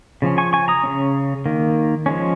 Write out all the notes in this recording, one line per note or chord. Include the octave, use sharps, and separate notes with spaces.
C#3 F3 C#4
G#5 C#6
G#5 C#6
A#5 D#6
C#3 A#3 C#4
D#3 A#3
F3 G#3 C#4